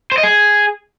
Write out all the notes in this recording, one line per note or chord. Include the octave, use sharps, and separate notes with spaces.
C5
D#5
G#4